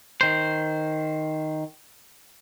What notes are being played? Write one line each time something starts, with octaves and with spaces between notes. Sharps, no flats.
D#3 C5